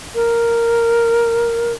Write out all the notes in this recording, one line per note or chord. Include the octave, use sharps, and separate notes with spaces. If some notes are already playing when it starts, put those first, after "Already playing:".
A#4